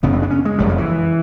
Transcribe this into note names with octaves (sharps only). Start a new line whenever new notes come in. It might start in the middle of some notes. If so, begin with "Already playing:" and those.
F#1 F#2 C#3 B3
C4
D4
C#4
G#3
F#1 F2 C#3 G3
F3
E3